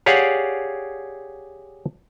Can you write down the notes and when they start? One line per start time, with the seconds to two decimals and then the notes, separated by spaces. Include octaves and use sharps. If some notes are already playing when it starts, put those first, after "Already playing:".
0.06 G4 G#4 C#5 D5 F5 F#5